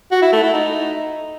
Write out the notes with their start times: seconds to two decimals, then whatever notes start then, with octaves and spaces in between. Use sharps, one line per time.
0.12 F#4
0.22 E4
0.33 A3
0.43 E4
0.54 D#4